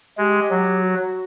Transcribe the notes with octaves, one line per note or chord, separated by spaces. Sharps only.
G#3 G4
F#3
F#4